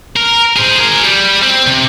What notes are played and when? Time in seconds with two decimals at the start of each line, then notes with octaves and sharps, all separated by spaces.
0.16 A#4
0.57 G#4 C5
0.78 G#4 A#4
1.05 G3
1.42 C4
1.67 C3